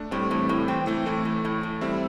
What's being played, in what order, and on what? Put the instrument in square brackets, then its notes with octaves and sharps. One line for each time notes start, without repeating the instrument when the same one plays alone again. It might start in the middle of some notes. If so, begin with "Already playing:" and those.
Already playing: [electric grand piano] A3 D4
[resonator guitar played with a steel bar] A2 [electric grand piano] G3 C4
[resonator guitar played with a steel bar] A2 [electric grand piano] E3 A3
[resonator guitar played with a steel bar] A2
[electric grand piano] E3 [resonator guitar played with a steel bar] C4
[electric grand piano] E3 A3 [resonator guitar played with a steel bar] C4
[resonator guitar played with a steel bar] A2 [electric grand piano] E3 A3
[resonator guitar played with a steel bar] A2
A2
A2
[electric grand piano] G3 C4 [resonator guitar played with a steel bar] E4